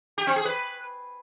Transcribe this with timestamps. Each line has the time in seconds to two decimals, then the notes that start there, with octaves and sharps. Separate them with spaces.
0.18 G4
0.27 C4
0.36 G#4
0.45 B4